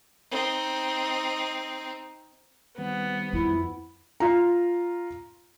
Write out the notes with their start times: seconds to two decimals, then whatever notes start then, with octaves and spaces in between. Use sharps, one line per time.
0.31 C4 D#4
2.78 D#3 G3 B3 C4
3.33 F2 E4
4.20 F4 A#5